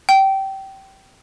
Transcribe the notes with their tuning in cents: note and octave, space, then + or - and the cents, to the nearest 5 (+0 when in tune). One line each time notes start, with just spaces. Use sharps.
G5 -20